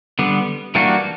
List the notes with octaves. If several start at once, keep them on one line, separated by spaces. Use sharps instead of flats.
D3 G3 B3
E3 G3 A#3 D4 F#4